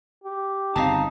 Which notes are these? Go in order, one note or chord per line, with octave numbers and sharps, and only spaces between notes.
G4
G1 C#3 C4 D#4 F5 A5